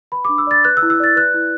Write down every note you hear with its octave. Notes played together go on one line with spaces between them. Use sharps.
B4 B5
D4 D6
E6
D5 A6
B4 F#6
E6
E4
E6
D5 A6
B4 F#6
E4